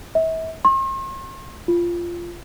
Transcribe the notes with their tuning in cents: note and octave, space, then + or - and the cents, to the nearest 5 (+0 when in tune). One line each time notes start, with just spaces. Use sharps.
E5 -35
C6 +45
F4 -15